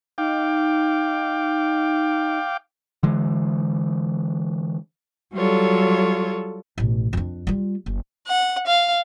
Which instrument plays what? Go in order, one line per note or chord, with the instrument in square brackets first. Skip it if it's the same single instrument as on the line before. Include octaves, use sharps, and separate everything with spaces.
[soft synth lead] D#4 [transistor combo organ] F5 G5 D6
[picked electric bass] D3 E3 G#3
[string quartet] F#3 G3 F4 A4 C#5
[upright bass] A1 B2
F2 D4
G3 F4
F#1
[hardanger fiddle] F#5
F5